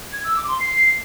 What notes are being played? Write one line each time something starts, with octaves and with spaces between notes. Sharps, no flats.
G#6
E6
D6
C6
C7